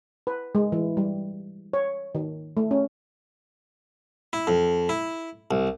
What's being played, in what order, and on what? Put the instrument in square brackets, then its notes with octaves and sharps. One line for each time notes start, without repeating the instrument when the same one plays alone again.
[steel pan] B4
G#3
E3
G3
C#5
D#3
A3
C#4
[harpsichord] E4
F2
E4
C2